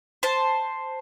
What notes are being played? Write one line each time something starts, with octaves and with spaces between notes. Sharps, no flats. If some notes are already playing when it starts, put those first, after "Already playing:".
C5 A5